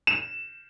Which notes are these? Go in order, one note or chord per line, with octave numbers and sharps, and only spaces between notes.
E7